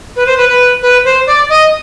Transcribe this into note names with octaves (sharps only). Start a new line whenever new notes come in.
B4
C5
B4
B4
B4
C5
D5
D#5